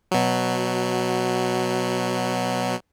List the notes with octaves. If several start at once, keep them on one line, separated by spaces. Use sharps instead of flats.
B2 F#3